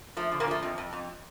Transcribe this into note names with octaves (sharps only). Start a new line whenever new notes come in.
F3 A3
D3
A#2 A#3
F3 A3
F2
F2
F2